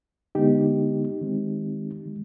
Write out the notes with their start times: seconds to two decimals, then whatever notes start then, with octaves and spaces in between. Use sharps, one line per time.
0.35 D3 G#3 B3 D#4 G4
1.21 D#3 G#3 C4
2.06 D#3 G#3